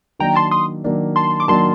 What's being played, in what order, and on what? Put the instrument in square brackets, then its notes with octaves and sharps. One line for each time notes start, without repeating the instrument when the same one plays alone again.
[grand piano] D#3 F#3 A#3 D4 [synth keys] G5 A#5
[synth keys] A5 C6
C6 D#6
[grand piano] D#3 F#3 A#3 D4
[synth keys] A5 C6
D6
[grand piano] D#3 F#3 A#3 D4 [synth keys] A5 C6